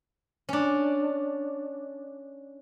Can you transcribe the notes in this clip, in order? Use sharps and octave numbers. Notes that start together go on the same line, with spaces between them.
C#4 D4